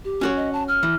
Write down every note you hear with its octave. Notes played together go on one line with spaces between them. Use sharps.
G4
C#4 F#4 C#5
D#5
A5
F6
E3